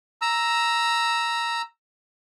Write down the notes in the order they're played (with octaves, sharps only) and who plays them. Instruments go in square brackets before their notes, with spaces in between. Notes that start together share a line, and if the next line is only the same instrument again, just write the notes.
[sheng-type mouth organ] A#5 E6